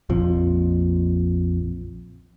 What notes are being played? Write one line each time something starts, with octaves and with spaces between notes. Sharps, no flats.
A#1 F2 F3